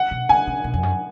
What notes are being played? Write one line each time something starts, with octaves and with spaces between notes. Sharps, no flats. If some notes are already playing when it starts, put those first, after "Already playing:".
Already playing: F#5
B2
D#3 G#5
C#3
B2
F2
F#2